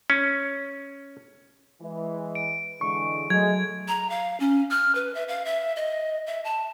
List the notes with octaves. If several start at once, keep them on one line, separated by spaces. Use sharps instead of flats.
C#4
E3 G#3
D7
D3 E3 G#3 C#6
F#3 G#3 A3 G#6
A#5
F5
C#4
F6
B4
E5
F5
E5
D#5
E5
A5